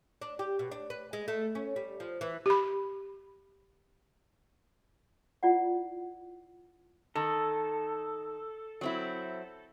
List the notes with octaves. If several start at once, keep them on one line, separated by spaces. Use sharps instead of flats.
D4
G4
B2
D4
B4
G#3
A3
C#4
G3
F3
E3
G4 B5
E4 F4 D5 F#5
D#3 A4
F#3 C4 E4